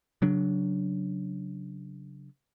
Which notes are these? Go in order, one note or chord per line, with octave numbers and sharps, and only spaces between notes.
C#3 F#3 D4